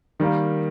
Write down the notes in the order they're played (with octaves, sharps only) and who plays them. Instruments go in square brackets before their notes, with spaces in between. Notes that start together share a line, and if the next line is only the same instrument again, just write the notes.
[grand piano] D#3 G3 A#3